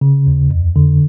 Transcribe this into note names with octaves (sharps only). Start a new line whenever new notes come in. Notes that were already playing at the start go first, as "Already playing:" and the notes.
C#3
D#2
F2
D3